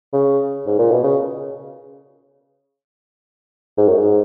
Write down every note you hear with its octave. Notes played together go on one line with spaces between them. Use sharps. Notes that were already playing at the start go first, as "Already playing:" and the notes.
C#3
G#2
A#2
B2
C#3
G#2
F#2
G#2